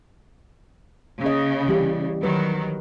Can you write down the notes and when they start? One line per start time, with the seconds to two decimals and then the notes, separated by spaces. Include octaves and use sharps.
1.22 C#3 A#3 D#5
1.67 E3 G3 G4
2.23 D#3 F#3 B4